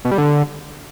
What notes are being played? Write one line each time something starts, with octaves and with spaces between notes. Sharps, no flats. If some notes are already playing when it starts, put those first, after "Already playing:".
B2
G3
D3